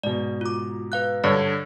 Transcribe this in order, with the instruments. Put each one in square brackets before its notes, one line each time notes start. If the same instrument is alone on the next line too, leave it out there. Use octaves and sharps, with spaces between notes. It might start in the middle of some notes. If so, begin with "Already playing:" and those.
[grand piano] G#2 B2 [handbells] D5
[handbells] F4 D6
B4 F5 F#6
[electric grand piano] G2 D3 C#5 [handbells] D5